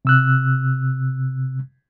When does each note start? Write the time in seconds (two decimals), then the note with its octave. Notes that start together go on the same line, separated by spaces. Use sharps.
0.05 C3 E6 F#6